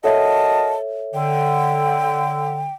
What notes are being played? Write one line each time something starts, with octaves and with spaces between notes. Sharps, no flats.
F#4 A4 A#4 C#5 D#5 E5 A5
D3 G5